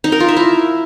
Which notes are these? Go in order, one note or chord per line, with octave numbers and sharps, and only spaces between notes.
D#4
A#4
F4
E5
E4